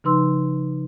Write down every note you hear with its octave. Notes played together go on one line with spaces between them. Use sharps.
C#3 F3 D#4 B4 C6 E6